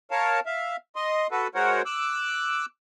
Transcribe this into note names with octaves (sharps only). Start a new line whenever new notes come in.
A#4 C#5 F5 A5
E5 F5
D#5 C6
F#4 A4 B4
G#3 F#4 A#4 C5 C#5 F#5
D6 E6 F#6